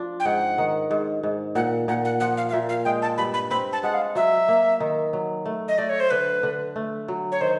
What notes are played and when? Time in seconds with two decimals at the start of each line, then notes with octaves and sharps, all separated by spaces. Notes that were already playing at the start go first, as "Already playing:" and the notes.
Already playing: F3 D4
0.20 G5
0.25 G#2 F#5
0.58 D#3
0.91 G#2
1.23 G#2
1.55 A#2 F#5
1.88 A#2 F#5
2.05 F#5
2.20 F3 F#5
2.37 F5
2.49 F5
2.53 A#2 E5
2.69 F5
2.85 G#3 G5
3.02 A5
3.18 G2 B5
3.34 B5
3.50 C4 B5
3.73 A5
3.83 G#3 F#5
3.94 F5
4.15 F#3 E5
4.48 A#3
4.80 D#3
5.13 F#3
5.46 A3
5.68 D#5
5.78 A3 D5
5.89 C#5
6.00 C5
6.10 D3 B4
6.43 D3
6.76 A3
7.08 F#3
7.32 C#5
7.41 D#3 C5